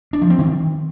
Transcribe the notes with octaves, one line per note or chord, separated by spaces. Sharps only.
D4
F3
C4
D#3